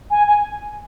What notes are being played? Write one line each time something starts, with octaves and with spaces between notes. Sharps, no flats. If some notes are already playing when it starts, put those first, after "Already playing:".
G#5
G#5